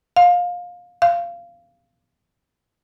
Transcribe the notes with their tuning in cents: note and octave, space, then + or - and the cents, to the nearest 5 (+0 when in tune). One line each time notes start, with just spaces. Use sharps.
F5 +20
F5 -15